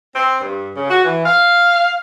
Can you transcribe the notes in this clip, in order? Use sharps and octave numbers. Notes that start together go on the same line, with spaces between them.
C4
G2
C#3
F#4
E3
F5